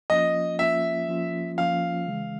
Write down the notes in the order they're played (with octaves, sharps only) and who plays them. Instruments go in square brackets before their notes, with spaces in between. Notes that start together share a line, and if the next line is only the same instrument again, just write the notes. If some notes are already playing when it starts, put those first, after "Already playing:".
[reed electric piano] F3 A#3 C#4 F4 [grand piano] D#5
[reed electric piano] F3 A#3 C#4 F4 [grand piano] E5
[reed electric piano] F3 A#3 C#4 F4
[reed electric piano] F3 A#3 C#4 F4 [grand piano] F5
[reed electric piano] C#3 E3 G#3